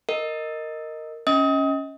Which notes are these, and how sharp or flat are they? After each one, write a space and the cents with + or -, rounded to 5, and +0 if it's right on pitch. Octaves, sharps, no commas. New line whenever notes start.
A#4 -10 D#5 +0
C#4 +0 D#5 +30 D#6 +30